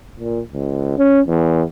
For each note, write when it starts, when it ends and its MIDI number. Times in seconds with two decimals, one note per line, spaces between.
0.19 0.40 46
0.53 0.97 37
0.98 1.20 61
1.27 1.62 40